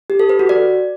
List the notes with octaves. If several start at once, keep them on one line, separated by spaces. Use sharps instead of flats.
G4
A4
B4
F#4
D5